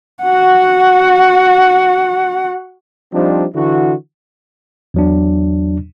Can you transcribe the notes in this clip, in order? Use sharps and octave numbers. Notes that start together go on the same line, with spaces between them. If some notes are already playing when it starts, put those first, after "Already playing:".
F#4 F#5
F3 G3 C4 D4 D#4
D3 E3 E4 F#4
E2 F#3 D4